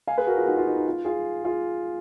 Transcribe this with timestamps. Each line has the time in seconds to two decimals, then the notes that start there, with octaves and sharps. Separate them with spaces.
0.07 F5 G#5
0.18 G#4 B4
0.27 F#4 A#4
0.38 F4 G#4
0.46 D#4 F#4
0.57 F4
0.66 D#4
0.76 D#4
0.86 F4
1.05 F4 G#4
1.44 F4 G#4